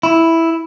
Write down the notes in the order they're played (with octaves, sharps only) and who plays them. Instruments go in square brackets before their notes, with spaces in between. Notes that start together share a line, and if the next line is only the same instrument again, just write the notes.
[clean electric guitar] E4